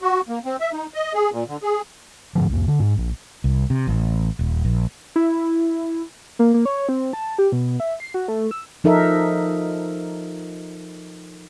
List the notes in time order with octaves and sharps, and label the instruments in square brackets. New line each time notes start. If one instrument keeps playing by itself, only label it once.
[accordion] F#4
A#3
C4
E5
D#4
D#5
G#4
A#2
D3
G#4
[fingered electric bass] G#2 D3 F3
C2 F2
D3
G#2
A#1
[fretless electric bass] C2
C3
A1
D#1
A#1
[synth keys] E4
[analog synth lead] A#3
A#3
C#5
C4
A5
G4
B2
E5
C7
F#4
A3
E6
[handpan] F3 D#4 A4 A#4 E5